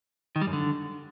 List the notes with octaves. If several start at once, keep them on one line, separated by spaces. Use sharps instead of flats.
D#3
G3
F#2
D3